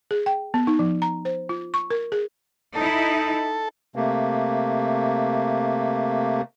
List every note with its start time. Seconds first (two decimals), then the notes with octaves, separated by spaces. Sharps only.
0.11 G#4
0.26 G5
0.54 B3
0.67 D#4
0.79 F3
1.02 A#5
1.25 C5
1.49 F4
1.74 C#6
1.90 A#4
2.12 G#4
2.75 D#4 E4 A4
3.96 C3 A3 A#3